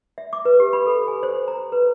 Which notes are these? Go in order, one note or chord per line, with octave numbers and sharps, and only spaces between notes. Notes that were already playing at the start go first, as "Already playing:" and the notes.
E5
D6
B4
G4
B5
A4
G#5
C5
A#5
B4